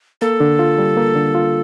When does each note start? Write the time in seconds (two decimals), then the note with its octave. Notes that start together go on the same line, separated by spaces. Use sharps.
0.21 A#3 A4
0.40 D3
0.59 F4
0.78 G3
0.97 A#3
1.16 D3
1.35 F4